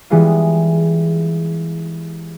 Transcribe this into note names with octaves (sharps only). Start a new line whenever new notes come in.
E3 G3 G#3 B3 F4